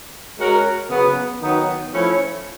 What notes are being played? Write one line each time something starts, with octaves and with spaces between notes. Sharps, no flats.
G#3 C#4 F#4 A#4
C#3 F#3 B3
D#3 F#3 B3 D#4
F3 A3 C#4 E4